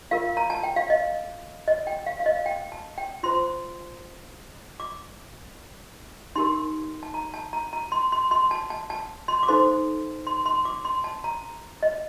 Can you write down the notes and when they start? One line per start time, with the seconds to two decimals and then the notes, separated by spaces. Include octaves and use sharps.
0.11 F4 A#4 F5
0.37 A#5
0.50 A5
0.64 G5
0.76 F5
0.90 D#5
1.68 D#5
1.87 G5
2.06 F5
2.20 F5
2.26 D#5
2.46 G5
2.72 A5
2.98 G5
3.23 F4 C5 C6
4.80 D6
6.36 D#4 G4 A#4 C6
7.03 A5
7.14 A#5
7.34 A5
7.53 A#5
7.73 A#5
7.92 C6
8.12 C6
8.31 C6
8.51 A5
8.70 A5
8.90 A5
9.28 C6
9.43 D6
9.48 D#4 A4 C5 C6
10.27 C6
10.46 C6
10.65 D6
10.85 C6
11.04 A5
11.24 A#5
11.83 D#5